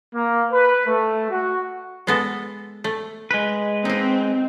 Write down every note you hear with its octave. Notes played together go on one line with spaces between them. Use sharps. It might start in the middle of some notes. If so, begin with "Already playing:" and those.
A#3
B4
A3
F#4
G#3 B3 A4
A3
G#3 B4
A#3 C4 D#4